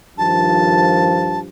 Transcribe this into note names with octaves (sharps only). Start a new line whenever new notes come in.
G2 D#3 F3 A5